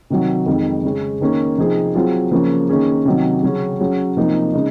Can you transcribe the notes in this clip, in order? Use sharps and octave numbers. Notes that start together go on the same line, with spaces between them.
C3 D#3 F#3
F2 D#3 G#3
C#3 G#3 C#4
D#3 A#3 C#4
C3 F3 C4 D#4 G#4
F#3 C4 F4 G#4
C#3 F3 A#3 C#4
D#3 A#3 C#4 G#4
C3 D#3 F#3
C#3 F#3 C#4 G#4
F#3 C#4 G#4
C3 F3 A#3 D#4
C#3 G#3 D#4